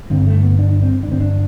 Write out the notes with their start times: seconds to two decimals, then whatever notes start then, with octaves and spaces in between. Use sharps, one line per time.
0.10 G2 D3 C4
0.27 A3
0.43 B3
0.59 D4
0.71 D4
0.83 C4
1.03 D4
1.07 G2 D3 C4
1.20 D4